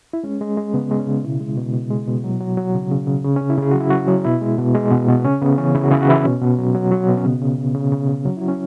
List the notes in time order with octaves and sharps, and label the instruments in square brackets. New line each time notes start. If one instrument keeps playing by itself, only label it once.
[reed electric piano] E4
G#3 C#4
G#3
G#3
C#3 B3
G#3
C#4
C#3
B2 E4
G#3
B2
B2
G#3
B2
F#3
F#3
F#3
C#3
C#3
C#3
C#3 C#4
C#4
C#3
E4
C#3 G#4
F#3 F#4
E4
F#3 F#4
F#3
B2 E4
G#3
B2
G#3
B2
B2
B3
C#3 C#4
C#3 B3
E3 C#4
C#3 E4
F#4
C#3 E4
F#4
E3 E4
B2 C#4
B2
F#3
F#3
F#3
B2
C#4
C#3 B3
C#3
C#3
C#3
C#3
C#3
F#3 C#4
F#3 E4
C#4